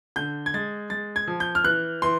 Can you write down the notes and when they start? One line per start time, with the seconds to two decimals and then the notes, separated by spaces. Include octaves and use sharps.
0.16 D3 G6
0.46 G#6
0.54 G#3 A6
0.90 G#3 A6
1.16 G#6
1.27 F3
1.40 G6
1.55 F6
1.64 E3 F#6
2.02 E3 C6